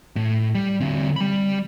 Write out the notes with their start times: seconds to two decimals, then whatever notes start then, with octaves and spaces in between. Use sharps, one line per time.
0.16 A2
0.55 G3
0.81 D3 C4
1.16 G3 B5